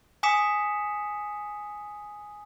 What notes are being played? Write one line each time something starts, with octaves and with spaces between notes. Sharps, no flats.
G#5 D6 D#6 B6 C#7 E7